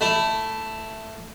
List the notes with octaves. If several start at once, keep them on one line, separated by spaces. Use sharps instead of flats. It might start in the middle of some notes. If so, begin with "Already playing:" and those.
A3 E4